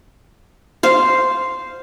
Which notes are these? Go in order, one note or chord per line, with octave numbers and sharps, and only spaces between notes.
C5 F5